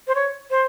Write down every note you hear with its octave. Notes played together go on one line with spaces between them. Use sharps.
C5
C#5
C5